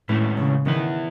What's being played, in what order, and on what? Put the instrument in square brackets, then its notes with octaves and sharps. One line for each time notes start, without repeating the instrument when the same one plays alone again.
[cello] A2 [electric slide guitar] D#3 G#3 C#4 E4 B4
[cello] C#3
[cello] D#3 [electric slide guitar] E3 B3 E4 B4